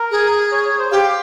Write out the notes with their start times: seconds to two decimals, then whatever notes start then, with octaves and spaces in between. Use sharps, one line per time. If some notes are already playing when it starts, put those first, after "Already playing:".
Already playing: A#4
0.11 G#4
0.52 C#5
0.66 C#5
0.79 C5
0.92 G4 F5